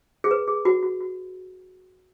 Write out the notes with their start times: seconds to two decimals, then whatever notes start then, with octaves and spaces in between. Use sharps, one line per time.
0.24 G#4
0.31 B4
0.48 G#4
0.65 F#4
0.83 F#4
1.00 F#4